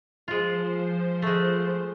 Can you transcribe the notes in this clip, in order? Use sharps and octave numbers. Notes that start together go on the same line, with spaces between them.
F3 G#3 F4 C5
G#3 A3